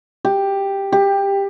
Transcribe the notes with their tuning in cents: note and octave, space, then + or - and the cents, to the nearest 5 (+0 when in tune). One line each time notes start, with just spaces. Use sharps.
G4 +5
G4 +15